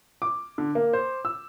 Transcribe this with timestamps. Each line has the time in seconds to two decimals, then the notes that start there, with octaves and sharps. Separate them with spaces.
0.22 D6
0.58 D3
0.75 A#3
0.93 C5
1.25 E6